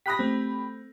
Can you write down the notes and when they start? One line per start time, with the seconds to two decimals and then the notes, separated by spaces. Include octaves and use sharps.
0.06 G4 B5 D#6 F#6 A#6 B6
0.19 A3 C4